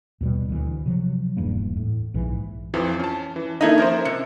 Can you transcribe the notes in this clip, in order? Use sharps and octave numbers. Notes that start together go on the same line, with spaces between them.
D#2 B2 G3
D2 E3
C3 F3 F#3
D#1 E2 G2 A#3
A2
A#1 G#2 E3
F2 E3 F3
C#4 A5
E3
A#3 D#4 E4 A4 D#5
F3 C#4 A#4 C5
C3 C#7